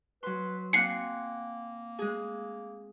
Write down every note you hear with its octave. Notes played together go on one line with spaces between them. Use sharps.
F#3 B4 C6
A#3 C4 F#5 G#5 C7 C#7
G#3 G#4